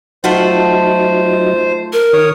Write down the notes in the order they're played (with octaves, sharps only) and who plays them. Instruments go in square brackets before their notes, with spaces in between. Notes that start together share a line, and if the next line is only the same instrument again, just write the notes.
[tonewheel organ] F#3 D#4 [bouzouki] A3 F4 F#5 [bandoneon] C5
[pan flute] A#4
[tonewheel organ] D#3 [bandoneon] C#5 D#6